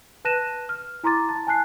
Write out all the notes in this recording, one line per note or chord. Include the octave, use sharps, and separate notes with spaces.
B4 A5 F#6 A#6 D#7 E7
F6
E4 A#5 C6 D6 A6
A5 A6
G#5 A5 F#6 C7